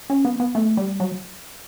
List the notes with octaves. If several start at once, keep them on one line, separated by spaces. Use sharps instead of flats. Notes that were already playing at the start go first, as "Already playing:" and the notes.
C#4
B3
B3
A3
G3
F#3